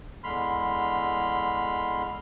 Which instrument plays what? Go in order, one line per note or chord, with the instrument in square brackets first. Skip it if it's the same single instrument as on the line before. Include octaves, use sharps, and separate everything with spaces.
[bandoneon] E2 D3 G#3 B5 C6 F6